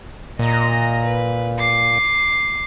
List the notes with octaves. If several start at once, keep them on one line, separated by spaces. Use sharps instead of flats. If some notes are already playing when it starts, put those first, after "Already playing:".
A#2 D#5 A#5
B4
D6 C7